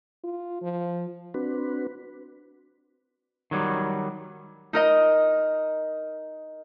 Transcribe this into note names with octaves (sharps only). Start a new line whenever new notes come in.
F4
F3
C4 D4 F#4 B4
D#3 F#3 G3
D#4 A#4 D#5